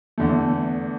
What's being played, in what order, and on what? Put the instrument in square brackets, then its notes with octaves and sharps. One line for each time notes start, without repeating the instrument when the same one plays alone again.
[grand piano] E2 D3 A3